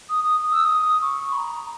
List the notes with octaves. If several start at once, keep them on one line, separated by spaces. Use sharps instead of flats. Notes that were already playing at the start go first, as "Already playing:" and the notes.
D#6
D#6
D#6
E6
D#6
C#6
B5
A#5